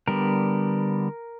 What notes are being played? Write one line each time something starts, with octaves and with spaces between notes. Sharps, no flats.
D3 G3 B3 A#4